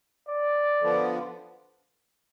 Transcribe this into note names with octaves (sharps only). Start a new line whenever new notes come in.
D5
D3 F3 B3